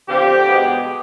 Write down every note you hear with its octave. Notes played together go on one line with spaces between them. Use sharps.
D3 F3 C4 G4
B2 G#3 B3